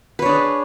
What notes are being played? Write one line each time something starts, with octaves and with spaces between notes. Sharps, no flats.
D4 G#4 B4 C#5